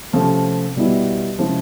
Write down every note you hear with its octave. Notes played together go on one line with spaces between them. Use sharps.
C3 F3 A3 C#4
B2 G3 B3 E4
C3 F3 G#3 C#4 E4